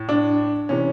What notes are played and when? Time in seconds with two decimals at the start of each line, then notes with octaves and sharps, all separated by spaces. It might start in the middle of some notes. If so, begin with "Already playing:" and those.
Already playing: A2
0.09 D4
0.69 C3 E3 C#4